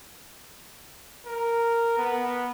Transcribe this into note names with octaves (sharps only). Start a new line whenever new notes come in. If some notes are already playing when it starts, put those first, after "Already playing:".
A#4
B3